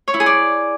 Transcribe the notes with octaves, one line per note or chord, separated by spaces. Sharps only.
C#5
E4
G#4
D5